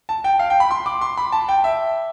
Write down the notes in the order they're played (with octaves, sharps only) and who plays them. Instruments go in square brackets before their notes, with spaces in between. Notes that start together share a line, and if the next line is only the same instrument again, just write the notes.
[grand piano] A5
G5
F5
G5
B5
C6
D6
C6
B5
A5
G5
E5